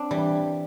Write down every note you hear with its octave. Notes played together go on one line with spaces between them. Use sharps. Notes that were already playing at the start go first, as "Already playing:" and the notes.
Already playing: C4 D4
E3 G3